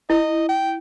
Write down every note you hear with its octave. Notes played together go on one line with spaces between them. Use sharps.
E4 D#5
G5